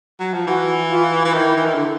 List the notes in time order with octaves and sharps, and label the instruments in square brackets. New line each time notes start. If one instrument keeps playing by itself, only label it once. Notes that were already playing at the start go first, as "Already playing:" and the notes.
[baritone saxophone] F#3
F3
[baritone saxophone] E3 [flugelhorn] F#4
[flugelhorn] F4
[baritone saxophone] E3
[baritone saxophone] D#3 [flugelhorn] E4
[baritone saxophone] E3
D#3
D3